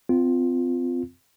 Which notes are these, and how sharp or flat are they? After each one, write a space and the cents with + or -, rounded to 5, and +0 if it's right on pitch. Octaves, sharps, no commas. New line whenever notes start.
C4 -30 F4 +0